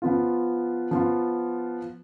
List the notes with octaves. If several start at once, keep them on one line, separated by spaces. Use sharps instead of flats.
F3 B3 F4
F3 B3 F4